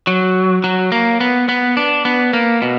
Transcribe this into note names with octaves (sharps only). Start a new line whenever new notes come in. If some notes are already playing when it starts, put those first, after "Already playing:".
F#3
F#3
A#3
B3
B3
D4
B3
A#3
B2